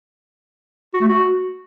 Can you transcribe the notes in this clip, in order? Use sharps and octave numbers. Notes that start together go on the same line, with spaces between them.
F#4
A3
F#4